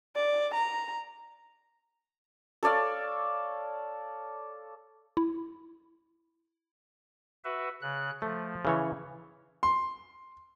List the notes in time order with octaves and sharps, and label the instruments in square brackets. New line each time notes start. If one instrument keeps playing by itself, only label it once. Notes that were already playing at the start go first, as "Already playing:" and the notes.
[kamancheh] D5
A#5
[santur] A4 C#5 D5 F5
[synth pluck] E4
[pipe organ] F#4 B4 E5
C#3 F#6
[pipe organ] F3 [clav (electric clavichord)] A3
[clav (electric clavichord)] C#3 E3 C#5
[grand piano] C6